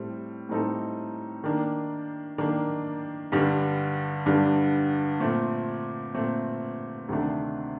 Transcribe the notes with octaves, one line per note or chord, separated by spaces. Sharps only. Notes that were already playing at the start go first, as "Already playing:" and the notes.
Already playing: A2 G3 C4 A4
A2 G3 C4 D#4 A4
D#3 A#3 D4
D#3 A#3 D4
G2 D3 G3 D4
G2 D3 G3 D4
A#2 A3 C4
A#2 A3 C4
D2 C3 D#3 A3 D4